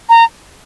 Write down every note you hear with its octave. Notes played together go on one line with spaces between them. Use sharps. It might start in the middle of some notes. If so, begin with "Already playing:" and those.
A#5